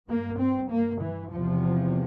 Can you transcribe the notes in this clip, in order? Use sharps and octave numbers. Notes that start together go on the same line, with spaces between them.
G2 A#3
C4
A#3
E3
E2 C3 F3